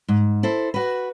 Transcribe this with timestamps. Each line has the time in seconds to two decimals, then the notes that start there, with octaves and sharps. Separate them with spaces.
0.08 G#2
0.43 E4 A4 C5
0.74 F#4 B4